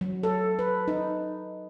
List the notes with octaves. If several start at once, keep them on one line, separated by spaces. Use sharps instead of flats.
F#3
A4
B4
D#4